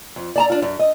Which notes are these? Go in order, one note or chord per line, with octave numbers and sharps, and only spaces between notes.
F2
D5 A5 A#5
D4 F4
F#2
D#5